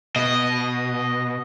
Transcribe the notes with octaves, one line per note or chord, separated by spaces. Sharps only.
B2 D#5